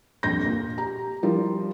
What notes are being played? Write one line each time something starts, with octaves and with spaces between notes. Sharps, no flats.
D#1 A#1 F2 G6 A#6
A#2
G4 A#5
F3 G3 E4 A#4